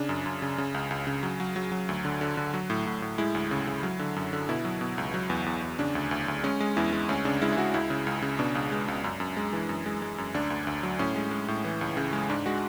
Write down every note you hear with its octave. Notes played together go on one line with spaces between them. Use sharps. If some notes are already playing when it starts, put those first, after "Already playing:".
Already playing: C#3 D4
F#2
F#2
C#3
C#3
C#2
C#2
C#3
F#3
F#3
F#3
F#3
D2
D3
D3
D3
F#3
A2
A2
A2
G#3 E4
D2
C#3
C#3
F#3
D3
F#2
D3
B2 E4
F#3
B2
C#2
F#3
E2
E2
E2
C#3 D4
D2
D2
D2
G#3 C#4
G#3
E2 E4
G#3
D2 C#4
C#3 D4
G#3 E4
E4
G#3 F#4
C#2 E4
C#3
C#2
C#3
B2 D4
C#2
G#3
C#2
F#2
F#2
G#3
E3
F#2
G#3
G#3
F#2
D2 D4
D2
D2
F#3
A2 C#4
G#3
G#3
A2
E3
C#2
C#3
G#3
G#2 D4
G#3 F#4